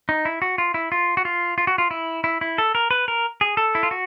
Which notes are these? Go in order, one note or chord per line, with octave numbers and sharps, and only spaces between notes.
D#4
E4
F#4
F4
E4
F4
F#4
F4
F4
F#4
F4
E4
E4
E4
A4
A#4
B4
A#4
G#4
A4
E4
F4
F#4